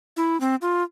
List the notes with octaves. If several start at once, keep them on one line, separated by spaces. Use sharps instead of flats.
E4
C4
F4